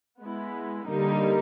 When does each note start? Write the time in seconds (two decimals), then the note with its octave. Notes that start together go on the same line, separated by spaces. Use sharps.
0.23 G#3 B3 E4
0.86 D3 G3 A#3 D#4